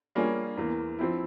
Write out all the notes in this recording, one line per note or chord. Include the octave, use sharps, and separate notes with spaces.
G3 A#3 C#4 F4 G#4
E2 E3 A#3
F3 C4 E4